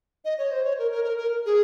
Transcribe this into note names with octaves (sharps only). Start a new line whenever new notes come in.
D#5
C#5
C5
C#5
A#4
A#4
A#4
A#4
G#4